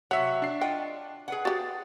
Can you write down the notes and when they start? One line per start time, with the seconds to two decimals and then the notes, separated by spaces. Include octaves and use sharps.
0.11 C3 F#3 C#5 E5 F#5
0.42 D4 C7
0.61 F4 D#5 F#5 G5
1.28 G#4 B4 F#5
1.45 F#4 G4 A6